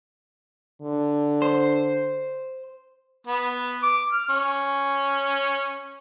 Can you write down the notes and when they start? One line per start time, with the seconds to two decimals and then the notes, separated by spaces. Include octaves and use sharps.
0.82 D3
1.42 C5
3.27 B3
3.83 D6
4.12 F6
4.29 C#4